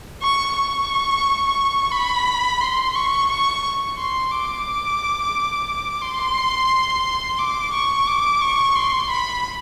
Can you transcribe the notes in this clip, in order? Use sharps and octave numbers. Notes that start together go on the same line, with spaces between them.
C#6
C#6
B5
C6
C#6
C#6
C6
D6
C6
D6
C#6
D6
C#6
C6
B5